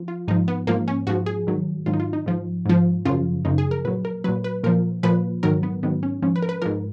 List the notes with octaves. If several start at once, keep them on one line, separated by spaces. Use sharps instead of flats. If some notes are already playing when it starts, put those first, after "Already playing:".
Already playing: F3
F4
G#2 F3 D#4
B3
G#2 F3 A#3
C#4
G#2 F3 F#4
G#4
G#2 D#3 F#3
G#2 D#3 F#3 F4
D#4
F4
D#4
G#2 F3
G#2 F3
F#2 C#3 F3 F4
F#2 C#3 F3 D#4
G#4
A#4
A#2 F#3 B4
A#4
A#2 F#3 B4
B4
A#2 F3 A#4
A#2 F3 B4
G#2 D#3 F#3 A#4
B3
G#2 D#3 F#3 B3
C#4
G#2 F3 C#4
B4
A#4
B4
G#2 F3 A#4